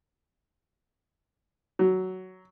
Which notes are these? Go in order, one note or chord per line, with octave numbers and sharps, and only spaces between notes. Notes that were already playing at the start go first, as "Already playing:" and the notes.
F#3